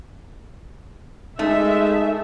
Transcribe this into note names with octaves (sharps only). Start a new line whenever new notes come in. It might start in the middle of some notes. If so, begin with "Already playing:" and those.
G#3 A3 D#4 G#4 A#4 E5